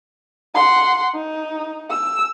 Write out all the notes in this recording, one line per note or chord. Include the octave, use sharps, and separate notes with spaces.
F#5 C6
D#4
E6